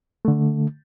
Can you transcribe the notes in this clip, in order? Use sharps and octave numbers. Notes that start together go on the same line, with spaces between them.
D3 A3